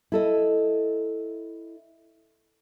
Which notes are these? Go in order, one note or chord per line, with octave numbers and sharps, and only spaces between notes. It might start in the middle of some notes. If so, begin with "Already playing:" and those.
E4 A4 D#5